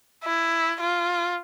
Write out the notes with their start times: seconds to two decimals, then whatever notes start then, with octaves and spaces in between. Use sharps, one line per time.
0.25 E4
0.81 F4